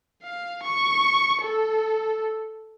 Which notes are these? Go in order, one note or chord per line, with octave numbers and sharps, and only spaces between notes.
F5
C#6
A4